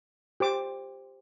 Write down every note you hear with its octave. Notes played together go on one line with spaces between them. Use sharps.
G4 C5 D6